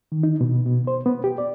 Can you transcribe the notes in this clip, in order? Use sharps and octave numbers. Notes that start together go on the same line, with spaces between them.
D#3
D#4
B2
B2
C5
B3
G4
D5